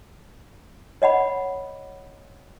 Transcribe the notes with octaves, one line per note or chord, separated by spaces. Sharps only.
C#5 D#5 F#5 B5